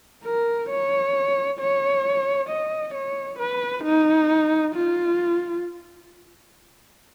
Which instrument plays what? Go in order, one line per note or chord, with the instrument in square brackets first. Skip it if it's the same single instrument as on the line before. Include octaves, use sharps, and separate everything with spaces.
[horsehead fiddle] A#4
C#5
C#5
D#5
C#5
B4
D#4
F4